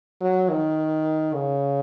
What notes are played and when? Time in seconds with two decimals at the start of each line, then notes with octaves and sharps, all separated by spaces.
0.21 F#3
0.50 D#3
1.34 C#3